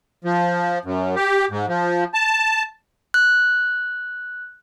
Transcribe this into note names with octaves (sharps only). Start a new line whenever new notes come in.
F3
F#2
G4
G#2
F3
A5
F#6